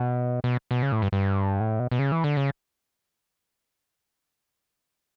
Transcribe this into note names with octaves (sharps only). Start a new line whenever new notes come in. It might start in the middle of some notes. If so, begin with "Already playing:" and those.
Already playing: B2
B2
B2
C#3
A2
G2
G2
A2
B2
B2
C#3
E3
D3
C#3